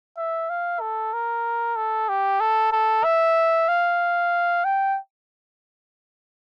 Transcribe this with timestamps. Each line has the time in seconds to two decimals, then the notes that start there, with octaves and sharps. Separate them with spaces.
0.17 E5
0.50 F5
0.81 A4
1.13 A#4
1.76 A4
2.09 G4
2.40 A4
2.72 A4
3.04 E5
3.68 F5
4.65 G5